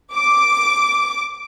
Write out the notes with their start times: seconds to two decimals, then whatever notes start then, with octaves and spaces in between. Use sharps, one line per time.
0.14 D6